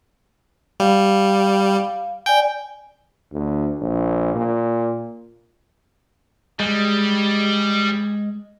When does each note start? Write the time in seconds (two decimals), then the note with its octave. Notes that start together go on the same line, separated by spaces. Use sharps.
0.80 G3 F5
2.26 D5 G5 G#5
3.33 D2
3.82 A#1
4.35 A#2
6.60 G3 G#3